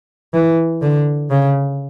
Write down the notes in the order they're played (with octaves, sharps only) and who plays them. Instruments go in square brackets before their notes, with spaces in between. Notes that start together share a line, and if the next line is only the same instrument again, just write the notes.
[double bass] E3
D3
C#3